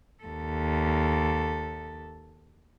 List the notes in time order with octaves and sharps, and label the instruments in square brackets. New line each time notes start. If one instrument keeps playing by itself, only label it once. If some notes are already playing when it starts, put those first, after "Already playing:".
[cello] D#2 A4